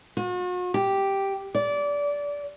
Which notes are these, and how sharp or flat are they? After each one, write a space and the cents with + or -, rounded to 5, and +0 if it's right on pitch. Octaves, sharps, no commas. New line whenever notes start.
F#4 -45
G4 -5
D5 -20